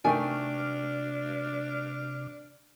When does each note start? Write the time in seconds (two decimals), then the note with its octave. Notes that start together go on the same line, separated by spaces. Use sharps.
0.05 C3 D#3 A3 D4 G5 G#5 D6 F6